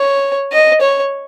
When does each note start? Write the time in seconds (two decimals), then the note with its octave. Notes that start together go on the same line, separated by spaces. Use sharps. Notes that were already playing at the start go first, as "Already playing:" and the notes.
Already playing: C#5
0.52 D#5
0.81 C#5